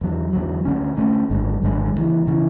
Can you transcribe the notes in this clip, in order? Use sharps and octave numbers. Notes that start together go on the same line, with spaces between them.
E2 D3 F#3
E2 D3 F#3
D2 D3 A3 C#4
D2 D3 A3 C#4
G#1 F#2 D3 G#3
G#1 F#2 D3 G#3
C#2 C#3 E3
C#3 E3